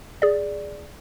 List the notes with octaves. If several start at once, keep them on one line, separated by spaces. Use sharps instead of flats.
G#4 D5